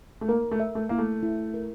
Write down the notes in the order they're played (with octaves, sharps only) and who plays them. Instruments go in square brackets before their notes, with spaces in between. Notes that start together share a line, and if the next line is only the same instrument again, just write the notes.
[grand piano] A3
[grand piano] A#3 [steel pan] A#4
[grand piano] A3
[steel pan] E5
[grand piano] A3
[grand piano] A#3 [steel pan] E4
[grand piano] A3
[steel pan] E4
A#4